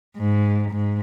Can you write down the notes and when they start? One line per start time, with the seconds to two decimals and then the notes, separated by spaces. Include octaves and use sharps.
0.17 G#2
0.71 G#2